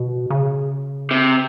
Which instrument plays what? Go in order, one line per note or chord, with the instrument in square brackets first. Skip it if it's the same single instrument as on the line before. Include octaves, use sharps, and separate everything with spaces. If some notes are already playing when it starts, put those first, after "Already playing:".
Already playing: [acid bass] B2
C#3
[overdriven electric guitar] C3